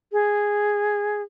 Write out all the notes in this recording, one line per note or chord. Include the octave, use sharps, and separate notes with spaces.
G#4